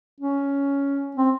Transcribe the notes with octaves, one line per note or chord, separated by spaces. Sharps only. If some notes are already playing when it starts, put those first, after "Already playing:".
C#4
C4